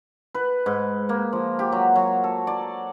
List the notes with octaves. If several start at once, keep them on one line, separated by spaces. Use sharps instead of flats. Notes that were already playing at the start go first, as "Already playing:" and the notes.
B4
G#2
A#3
F3
G4
F#3
F#3
A4
D5